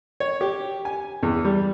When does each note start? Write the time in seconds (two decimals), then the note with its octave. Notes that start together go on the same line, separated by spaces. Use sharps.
0.20 C#5
0.41 G4
0.85 G#5
1.23 E2
1.45 G3